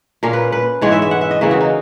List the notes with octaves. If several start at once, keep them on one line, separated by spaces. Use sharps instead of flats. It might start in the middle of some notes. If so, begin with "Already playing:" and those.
A#2 A#3 C#4 A#4
B4
B4
G#2 E3 G#3 B3 C#5
E5
E5
F#5
E5
D#5
C#3 E3 A#3 C#4 E5
F#4
D#4